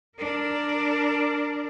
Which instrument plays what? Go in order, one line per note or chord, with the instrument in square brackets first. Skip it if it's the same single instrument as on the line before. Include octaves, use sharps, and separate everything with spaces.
[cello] D4 A#4